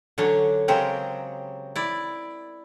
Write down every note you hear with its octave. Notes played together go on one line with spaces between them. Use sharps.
D3 F#3 C#4 D4
C#3 F#3 G#3 C4 G4 A#4
E4 D5